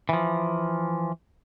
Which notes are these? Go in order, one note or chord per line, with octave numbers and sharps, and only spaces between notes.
E3 F3